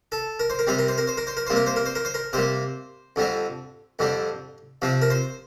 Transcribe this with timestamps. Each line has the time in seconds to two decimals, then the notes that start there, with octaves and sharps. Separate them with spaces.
0.12 A4
0.40 A#4
0.50 C5
0.59 A#4
0.67 C3 G3 C4 C5
0.79 A#4
0.88 C5
0.98 A#4
1.07 C5
1.17 A#4
1.27 C5
1.37 A#4
1.47 C3 G3 A#3 C5
1.56 A#4
1.66 C5
1.76 A#4
1.86 C5
1.95 A#4
2.05 C5
2.14 A#4
2.33 C3 G3 A#3 C5
3.16 F2 D3 G3 C4
3.99 F2 D3 G3 C4
4.82 C3 F3 C4
5.02 A#4
5.10 C5